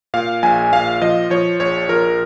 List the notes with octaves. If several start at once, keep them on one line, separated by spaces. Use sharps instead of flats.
A#2 F5
A#1 G#5
A#2 F5
F3 D#5
F3 C#5
A#1 C#5
F3 A#4